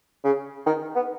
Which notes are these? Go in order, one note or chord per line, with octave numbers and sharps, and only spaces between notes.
C#3
D#3
B3